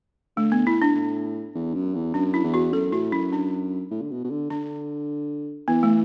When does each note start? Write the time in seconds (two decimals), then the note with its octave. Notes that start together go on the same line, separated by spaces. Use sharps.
0.37 D3 A3
0.52 B3
0.67 A2 E4
0.82 D4
0.96 A2
1.55 E2
1.75 F#2
1.95 E2
2.14 F#2 D4
2.34 E4
2.44 E2
2.54 F#4
2.73 F#2 A4
2.92 A2 F#4
3.12 F#2 E4
3.33 D4
3.91 A2
4.02 D3
4.11 B2
4.25 B2
4.30 D3
4.50 D3 D4
5.68 E3 B3
5.83 A3